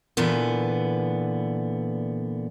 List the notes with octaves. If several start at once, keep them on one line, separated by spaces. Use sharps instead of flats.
A#2 D3 E3 B3